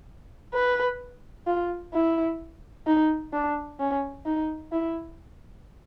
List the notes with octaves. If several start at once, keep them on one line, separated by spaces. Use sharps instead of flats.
B4
F4
E4
D#4
D4
C#4
D#4
E4